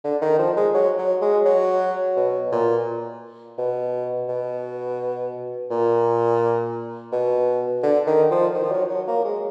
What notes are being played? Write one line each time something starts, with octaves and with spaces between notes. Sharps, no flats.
D3
D#3
F3
G#3
F#3
F#3
G#3
F#3
B2
A#2
B2
B2
A#2
B2
D3
D#3
F3
D#3
F3
F#3
F#3
A#3
G#3